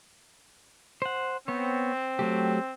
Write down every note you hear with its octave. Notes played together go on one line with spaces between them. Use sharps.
C5 F#5
B3 C4 C#5
F#3 A3 G4